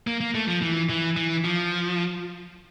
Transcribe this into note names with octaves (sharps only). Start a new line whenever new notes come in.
A#3
A#3
A3
F3
E3
E3
E3
F3